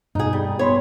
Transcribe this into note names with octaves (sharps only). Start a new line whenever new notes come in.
G2 B2 D#4 G#4
G3
B3 C#5 B5 C6